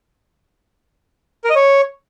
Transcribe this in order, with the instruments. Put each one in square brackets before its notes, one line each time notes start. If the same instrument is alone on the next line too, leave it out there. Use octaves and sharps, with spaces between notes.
[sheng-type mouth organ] A#4
D#5
C#5